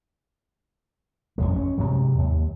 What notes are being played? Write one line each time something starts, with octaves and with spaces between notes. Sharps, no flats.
A1 F2 G#2 G#3
C#4
G#2 C3 F#3
D#2